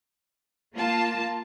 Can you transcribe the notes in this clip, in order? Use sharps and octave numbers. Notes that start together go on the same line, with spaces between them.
A#3 F4 A5